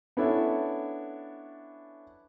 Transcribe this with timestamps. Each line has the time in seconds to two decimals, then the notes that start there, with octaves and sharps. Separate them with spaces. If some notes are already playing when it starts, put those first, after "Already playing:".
0.17 B3 C#4 D4 E4 A4